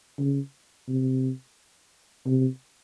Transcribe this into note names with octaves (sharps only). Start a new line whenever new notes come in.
C#3
C3
C3